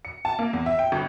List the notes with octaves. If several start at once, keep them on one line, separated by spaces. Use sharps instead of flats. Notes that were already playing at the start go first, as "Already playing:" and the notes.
C#7
A5
A#3
E2
E5
G5
G1